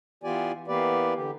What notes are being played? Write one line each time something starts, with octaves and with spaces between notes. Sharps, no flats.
E3 B3 F4 G4 D5 G#5
E3 A#3 B3 G4 B4 D5
D3 G4